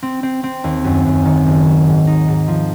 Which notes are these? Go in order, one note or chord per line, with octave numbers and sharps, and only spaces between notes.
C4
C4
C4
D#2
F#2
F#2
D#3
F#1
F#3
G#2
D#4
G#2
F3